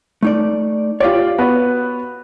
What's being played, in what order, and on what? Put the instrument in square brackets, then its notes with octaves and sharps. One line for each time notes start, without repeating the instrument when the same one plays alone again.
[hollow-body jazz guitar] A3 D#4 D5
[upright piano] F4 G4 D5 [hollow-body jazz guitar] C#5 F5
[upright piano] B3 F#4 B4